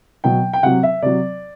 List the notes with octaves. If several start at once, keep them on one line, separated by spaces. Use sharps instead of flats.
B2 F#3 G5
G5
C3 F#3 F#5
E5
C3 F#3 D5